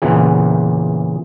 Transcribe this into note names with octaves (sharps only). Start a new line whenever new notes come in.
E2 A#2 C#3 E3